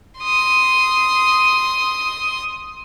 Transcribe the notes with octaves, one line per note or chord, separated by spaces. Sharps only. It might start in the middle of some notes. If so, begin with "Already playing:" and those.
C6 D#6